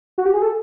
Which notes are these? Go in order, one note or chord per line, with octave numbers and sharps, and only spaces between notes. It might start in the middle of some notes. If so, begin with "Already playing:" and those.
F#4
G4
G#4
A4